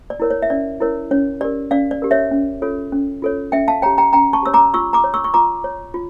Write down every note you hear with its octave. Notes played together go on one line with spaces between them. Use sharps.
D5
E4 A#4 C#5
C#5
E5
C#4 D5
E4 A#4 C#5
C#4 C#5
G4 A#4 D5
C#4 D5 F5
D5
G4 A#4
C#5 E5
C#4
F4 A4 C#5
C#4
F4 A4 C#5
C#4 E5 G5
F5 A5
G4 C#5 G5 A#5
G5 A#5
C#4 G5 A#5
A5 C#6
G4 C#5 E6
A#5 D6
F4 C#6 E6
A#5 D6
C#5
C#6 E6
C#6
F4 A#5 D6
C#5
F4